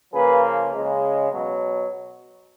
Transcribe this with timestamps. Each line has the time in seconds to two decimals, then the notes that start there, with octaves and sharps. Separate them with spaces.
0.13 C#3 F3 A#3 G#4 B4
0.73 C#3 G#3
1.31 B2 F#3